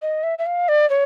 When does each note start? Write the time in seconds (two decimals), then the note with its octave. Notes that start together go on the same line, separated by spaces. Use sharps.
0.02 D#5
0.23 E5
0.39 E5
0.46 F5
0.68 D5
0.90 C#5